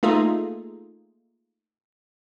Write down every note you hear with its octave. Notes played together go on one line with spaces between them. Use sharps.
A3 A#3 D#4 F4 G#4 A4